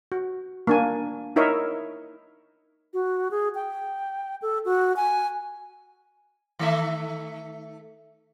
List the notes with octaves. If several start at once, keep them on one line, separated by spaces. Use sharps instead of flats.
F#4
A#3 D4 G#5
D#4 E4 A#4 C#5 D#5 E5
F#4
G#4
G5
A4
F#4
G#5
D#3 A3 E5